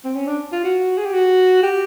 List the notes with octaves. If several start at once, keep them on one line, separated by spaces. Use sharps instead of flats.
C4
C#4
D4
F4
F#4
G#4
G4
F#4
G4